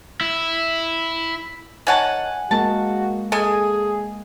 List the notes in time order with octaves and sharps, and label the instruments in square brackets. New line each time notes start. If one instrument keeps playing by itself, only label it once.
[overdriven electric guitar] E4
[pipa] D#3 C#5 A5 [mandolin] F#5 G#5
[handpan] G#3 A#3 [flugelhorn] F#4 [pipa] A5
[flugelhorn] G#4 [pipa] A4 D#5 [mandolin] G#5